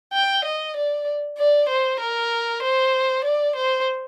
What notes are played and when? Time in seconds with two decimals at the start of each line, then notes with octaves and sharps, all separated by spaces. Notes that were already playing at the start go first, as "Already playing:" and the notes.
0.13 G5
0.45 D#5
0.76 D5
1.38 D5
1.69 C5
2.00 A#4
2.62 C5
3.24 D5
3.56 C5